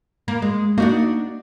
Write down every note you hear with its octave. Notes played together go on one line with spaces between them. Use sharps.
A#3
G#3
A#3 D4 D#4 F#4